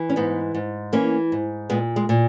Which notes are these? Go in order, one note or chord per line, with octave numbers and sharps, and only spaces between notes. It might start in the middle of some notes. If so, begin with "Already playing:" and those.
Already playing: E3
C#4
G#2 B3 D#4
G#2
E3 A#3 C#4
G#2
A#2 G#3 B3
G#3
A#2